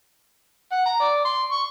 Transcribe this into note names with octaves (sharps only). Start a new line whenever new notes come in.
F#5
A#5
D5
C6
C#6